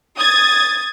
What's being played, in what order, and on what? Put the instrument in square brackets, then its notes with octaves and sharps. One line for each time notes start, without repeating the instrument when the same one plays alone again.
[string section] D#6 G#6 A6